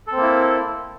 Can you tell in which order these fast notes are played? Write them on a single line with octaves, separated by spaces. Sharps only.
A4 C4 A#3 E4